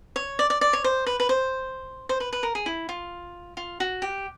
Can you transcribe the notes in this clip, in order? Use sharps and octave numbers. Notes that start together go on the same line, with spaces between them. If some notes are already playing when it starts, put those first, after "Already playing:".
C#5
D5
D5
D5
C#5
C5
B4
B4
C5
C5
B4
B4
A#4
G#4
E4
F4
F4
F#4
G4